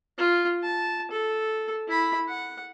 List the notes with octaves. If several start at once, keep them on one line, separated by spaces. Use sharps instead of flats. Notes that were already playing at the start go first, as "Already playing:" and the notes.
F4
A5
A4
E4 B5
F#5